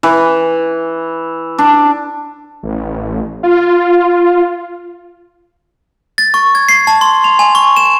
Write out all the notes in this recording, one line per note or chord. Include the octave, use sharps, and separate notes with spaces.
E3
D4
A1
F4
A6
C#6
G#6
C7
A5
C6
F7
G#5
C#6
E7